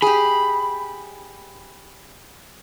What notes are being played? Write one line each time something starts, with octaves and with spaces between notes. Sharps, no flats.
G4 G#4 B5